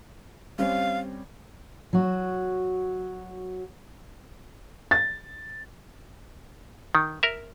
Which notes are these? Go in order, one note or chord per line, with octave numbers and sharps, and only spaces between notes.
G3 C4 C#4 F5
F#3 F#4
A6
D#3
A#4 E5